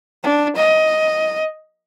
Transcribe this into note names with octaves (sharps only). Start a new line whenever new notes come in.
D4
D#5